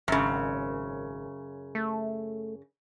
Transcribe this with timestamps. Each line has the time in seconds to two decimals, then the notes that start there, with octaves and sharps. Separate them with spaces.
0.08 G#1 F#2 C#3
1.75 A3